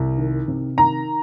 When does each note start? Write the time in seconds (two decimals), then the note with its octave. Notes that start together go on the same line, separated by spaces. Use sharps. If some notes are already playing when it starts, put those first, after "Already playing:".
Already playing: C2
0.18 D#3
0.48 C3
0.78 D#3 A#5